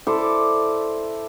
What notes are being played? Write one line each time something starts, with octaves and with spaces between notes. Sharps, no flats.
E4 A4 C5 D5